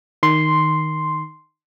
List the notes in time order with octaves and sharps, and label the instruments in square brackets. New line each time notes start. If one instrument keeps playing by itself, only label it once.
[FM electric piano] D#3 C6